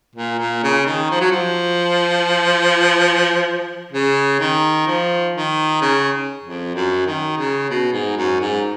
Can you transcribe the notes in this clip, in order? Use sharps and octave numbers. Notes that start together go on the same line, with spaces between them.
A#2
A#2
C#3
D#3
F3
F#3
F3
C#3
D#3
F3
D#3
C#3
F2
F#2
D#3
C#3
B2
G#2
F#2
G#2